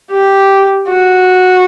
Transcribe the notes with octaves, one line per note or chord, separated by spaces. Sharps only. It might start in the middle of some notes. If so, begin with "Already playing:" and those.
G4
F#4